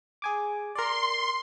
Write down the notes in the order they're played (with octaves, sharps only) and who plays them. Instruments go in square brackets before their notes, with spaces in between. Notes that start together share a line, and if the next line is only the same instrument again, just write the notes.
[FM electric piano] G#4 G#5 D6
[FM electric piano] A#4 D5 [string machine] C6